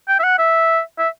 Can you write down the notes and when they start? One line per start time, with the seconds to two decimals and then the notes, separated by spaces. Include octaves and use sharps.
0.08 G5
0.19 E5
0.24 F#5
0.39 E5
0.99 E5